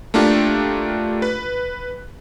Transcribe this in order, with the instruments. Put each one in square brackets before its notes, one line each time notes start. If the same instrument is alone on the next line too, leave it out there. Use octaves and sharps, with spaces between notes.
[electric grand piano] A3 A#3 D4 F4 G4
B4